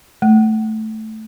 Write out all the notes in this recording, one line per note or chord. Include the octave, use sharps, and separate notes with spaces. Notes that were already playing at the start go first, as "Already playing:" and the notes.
A3